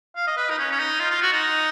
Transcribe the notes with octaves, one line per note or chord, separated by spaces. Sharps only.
F5
D#5
B4
D#4
C#4
C#4
D#4
F4
F4
F#4
D#4